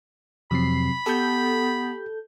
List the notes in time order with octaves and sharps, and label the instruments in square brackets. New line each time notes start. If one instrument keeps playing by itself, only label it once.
[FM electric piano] F2 C7 [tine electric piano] C3 F#3 C4 [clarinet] B5
[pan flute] B3 [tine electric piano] G4 [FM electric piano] A4 G6